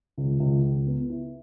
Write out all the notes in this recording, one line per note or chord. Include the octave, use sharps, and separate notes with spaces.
C#2
C#2
C#2
B3
E4